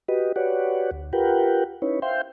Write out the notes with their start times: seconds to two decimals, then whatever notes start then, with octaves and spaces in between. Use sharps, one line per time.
0.08 F#4 G4 B4 D#5
0.36 F#4 G4 B4 C#5 D5 F#5
0.91 D2
1.13 F4 G4 A#4 B4 F#5 G5
1.82 C#4 D#4 E4 B4 C#5
2.02 C5 E5 F5 G5 C6 G6